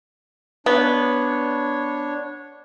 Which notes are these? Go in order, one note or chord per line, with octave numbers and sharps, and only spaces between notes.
B3 D4 C#5